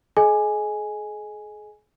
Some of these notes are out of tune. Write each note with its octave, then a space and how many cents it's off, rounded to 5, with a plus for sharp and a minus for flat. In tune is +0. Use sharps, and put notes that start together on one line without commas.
G#4 +40 D#5 +0 G#5 +0